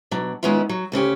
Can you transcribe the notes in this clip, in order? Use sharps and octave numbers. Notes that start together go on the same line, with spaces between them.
B2 F#3 D4
D#3 G#3 B3 C#4 E4 F4
F#3
D2 C#3 C#4 G4